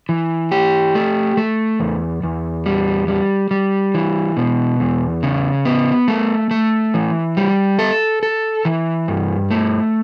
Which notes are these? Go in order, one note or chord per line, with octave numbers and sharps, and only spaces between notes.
E3
G4
A3
A3
E2
E2
G3
G3
G3
E3
B2
E2
C#3
B3
A3
A3
E3
G3
A4
A4
E3
G2
A3